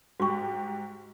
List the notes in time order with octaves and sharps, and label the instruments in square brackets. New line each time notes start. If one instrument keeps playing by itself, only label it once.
[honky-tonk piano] G#2 G4 [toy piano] F#4 C#6